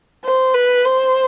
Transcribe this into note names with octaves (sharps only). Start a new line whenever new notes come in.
C5
B4
C5